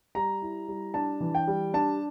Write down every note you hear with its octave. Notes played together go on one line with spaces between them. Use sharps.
G3 A#5
E4
G3
D4 A5
E3
G5
G3
D4 A5